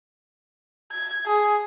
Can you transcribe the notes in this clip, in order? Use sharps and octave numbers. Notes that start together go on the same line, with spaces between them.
G#6
G#4